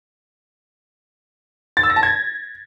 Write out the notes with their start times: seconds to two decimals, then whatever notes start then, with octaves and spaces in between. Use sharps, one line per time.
1.77 A6
1.83 E6
1.90 A#6
1.96 A5
2.03 G#6